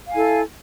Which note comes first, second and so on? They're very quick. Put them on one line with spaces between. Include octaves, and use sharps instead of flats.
F5 G#5 E4 A4